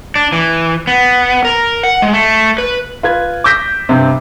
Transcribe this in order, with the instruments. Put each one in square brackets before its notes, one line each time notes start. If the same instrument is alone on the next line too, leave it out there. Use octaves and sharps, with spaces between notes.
[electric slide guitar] D4
E3
B3
A#4
F#5
G#3
A3
B4
[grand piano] F4 B4 G#6
D6 E6 G6 A#6 B6
G2 C3